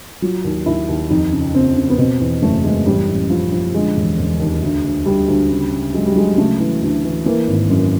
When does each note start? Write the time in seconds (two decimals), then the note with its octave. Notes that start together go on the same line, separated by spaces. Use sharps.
0.22 F#3 F4
0.44 D#2
0.66 D#2 E4
0.88 D#2
1.10 F2 D#4
1.32 C#3
1.54 C#3 C4
1.76 C#3
1.90 B3
1.98 B2 C4
2.20 E2
2.42 F#1 A3
2.64 F#1 G#3
2.86 A1 G3
3.07 A1
3.30 F3
3.52 F3
3.74 D3 G#3
3.96 E1
4.18 E1
4.40 D#2
4.62 D2
4.84 D2
5.06 D2 G3
5.28 D2
5.50 C#3
5.72 C#3
5.94 F#3 G#3
6.06 G3
6.16 F#3 G#3
6.38 C#3 A3
6.60 E3
6.82 D2
7.04 E3
7.26 E3 A#3
7.48 G#1
7.70 F#2